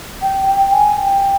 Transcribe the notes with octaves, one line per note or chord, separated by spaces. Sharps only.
G5
G5
G#5
G5